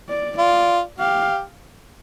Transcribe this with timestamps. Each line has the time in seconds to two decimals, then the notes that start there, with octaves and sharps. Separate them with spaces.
0.09 D5
0.38 F4 D5
0.98 G4 F5